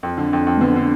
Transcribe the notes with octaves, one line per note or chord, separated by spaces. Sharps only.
F2
D3
F2
F2
A3
D3 B3
D3